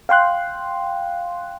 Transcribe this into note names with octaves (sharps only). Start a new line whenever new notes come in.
F5 G5 C6 F#6